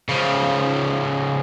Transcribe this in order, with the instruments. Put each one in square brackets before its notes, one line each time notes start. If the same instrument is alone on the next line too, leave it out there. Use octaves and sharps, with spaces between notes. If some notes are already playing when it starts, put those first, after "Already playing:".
[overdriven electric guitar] C#3 F3